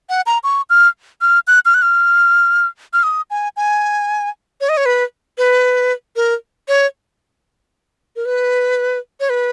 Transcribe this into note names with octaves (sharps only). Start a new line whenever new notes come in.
F#5
A#5
C#6
F6
F6
F#6
F6
F#6
F6
F6
D#6
G#5
G#5
C#5
D#5
C#5
B4
B4
A#4
C#5
A#4
B4
C#5
B4